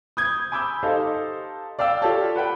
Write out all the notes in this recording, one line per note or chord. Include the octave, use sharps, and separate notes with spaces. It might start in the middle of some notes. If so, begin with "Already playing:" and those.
D#6 G6 G#6
G#5 B5 D6 E6 G6
D#4 G4 A4 C5 F5
D5 F5 G5 E6
F4 G4 A4 C#5 D5 A5
B4 F#5 G5